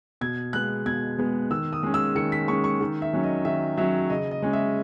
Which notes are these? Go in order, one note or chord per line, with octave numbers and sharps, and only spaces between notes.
B2 G#6
G#3 B3 F#6
B2 G#6
G#3 B3
D#3 E6
D#6
G#3 C#4
E6
D#3 C#7
B6
G#3 C#4 C#6
C#6
D#3
E5
F#3 C#4
D#5
D#3 E5
F#3 C#4 E5
C#3 D#5
D#5
G#3 C#4
E5